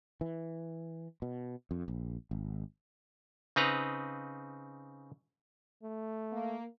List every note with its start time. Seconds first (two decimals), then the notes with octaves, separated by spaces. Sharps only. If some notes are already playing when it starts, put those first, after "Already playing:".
0.21 E3
1.22 B2
1.71 F2
1.88 A#1
2.31 G#1
3.56 C#3 C4 D#4 B4 A#5
5.83 A3
6.33 A#3